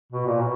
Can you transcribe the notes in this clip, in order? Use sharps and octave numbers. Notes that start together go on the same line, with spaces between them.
B2
A#2
B2